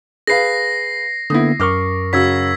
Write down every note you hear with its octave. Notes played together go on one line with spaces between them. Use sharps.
G#4 B4 F5 A#6 C7
D3 A#3 B3 E4 D#6
F#2 A#4 C#6 D6 F6
C#3 F#3 E6 G#6 B6